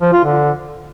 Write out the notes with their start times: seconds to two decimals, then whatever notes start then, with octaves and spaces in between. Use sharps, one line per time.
0.01 F3
0.13 F4
0.24 D3